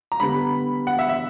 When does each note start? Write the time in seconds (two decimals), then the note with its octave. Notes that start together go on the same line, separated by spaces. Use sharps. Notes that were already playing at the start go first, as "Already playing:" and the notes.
0.12 A#5
0.20 D3 G3 B3 B5
0.87 F#5
0.99 E5
1.09 E5